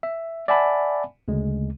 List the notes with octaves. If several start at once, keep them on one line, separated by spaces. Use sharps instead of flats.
E5
D5 E5 F#5 G#5 A5 B5
D2 C#3 G#3